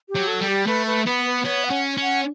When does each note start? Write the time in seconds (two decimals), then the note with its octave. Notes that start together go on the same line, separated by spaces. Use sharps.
0.09 G4
0.15 F#3
0.28 A4
0.41 G3
0.48 G4
0.66 A3 B4
0.87 B4
1.06 B3 B4
1.26 B4
1.45 B3 C#5
1.64 F#5
1.70 C#4
1.97 C#4
2.03 F#5